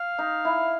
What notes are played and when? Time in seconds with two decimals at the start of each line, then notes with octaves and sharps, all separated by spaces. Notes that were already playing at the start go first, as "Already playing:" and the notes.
Already playing: F5
0.19 D#4
0.45 E4